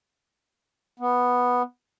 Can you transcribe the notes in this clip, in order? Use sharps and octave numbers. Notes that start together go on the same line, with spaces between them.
B3